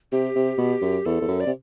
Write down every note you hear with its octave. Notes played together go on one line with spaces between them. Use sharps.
C3 G4
C3
B2
F#2
E2 A4
E2
F#2
D5
C3